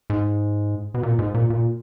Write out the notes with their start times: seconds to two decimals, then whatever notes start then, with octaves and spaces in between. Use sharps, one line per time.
0.10 G#2
0.94 B2
1.03 A#2
1.19 G#2
1.34 A#2
1.50 A#2